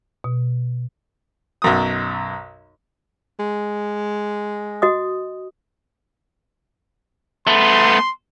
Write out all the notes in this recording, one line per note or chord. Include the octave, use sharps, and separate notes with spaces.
B2
B1 F#2 D#6
G#3
F#4 D#5 D#6
A3 B3 C6